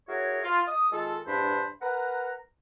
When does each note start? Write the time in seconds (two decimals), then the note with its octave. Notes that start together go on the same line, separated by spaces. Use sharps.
0.09 E4 F#4 G#4 A#4 C#5
0.44 F4
0.68 D#6
0.92 D#3 G#3 F4 A4
1.27 E2 G2 D4 C5 B5
1.82 A#4 B4 F#5 A#5